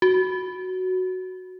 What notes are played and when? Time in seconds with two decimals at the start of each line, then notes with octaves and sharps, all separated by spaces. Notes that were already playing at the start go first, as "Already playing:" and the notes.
0.02 F#4